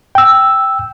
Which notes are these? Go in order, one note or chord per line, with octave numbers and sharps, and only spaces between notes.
G5 E6